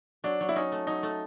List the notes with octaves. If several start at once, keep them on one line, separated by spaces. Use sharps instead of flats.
F#3 D4
F#3
E4
C#4 D#4
A3
F#3 D#4
A3